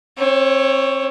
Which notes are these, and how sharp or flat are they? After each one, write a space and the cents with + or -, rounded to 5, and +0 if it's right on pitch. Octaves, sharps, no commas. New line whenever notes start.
C4 +30 C#5 +0